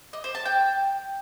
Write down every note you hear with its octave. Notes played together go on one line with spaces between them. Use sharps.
D#5
C5
A5
G5